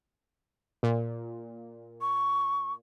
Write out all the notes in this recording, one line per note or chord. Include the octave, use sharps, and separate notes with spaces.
A#2
C#6